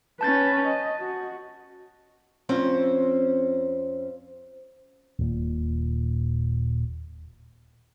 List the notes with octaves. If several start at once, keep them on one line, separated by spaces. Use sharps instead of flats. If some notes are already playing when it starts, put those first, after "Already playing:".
C#4 B4 A5 G6 A6
D#5
F#4
F2 C4 C#4 C5
D#1 A#2